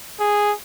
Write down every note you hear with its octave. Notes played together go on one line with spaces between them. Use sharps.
G#4